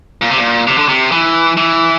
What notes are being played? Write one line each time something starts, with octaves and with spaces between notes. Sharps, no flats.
A#2
C3
A#2
C3
D3
C3
E3
E3